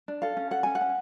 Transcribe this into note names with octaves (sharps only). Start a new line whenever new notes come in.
D4
A4 F5
C#4
A4 F#5
C#4 G#5
F#5
C#4